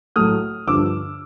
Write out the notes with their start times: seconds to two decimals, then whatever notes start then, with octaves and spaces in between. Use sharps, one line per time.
0.16 A2 F#3 A3 D#6 F6
0.67 G2 D3 F3 D6 E6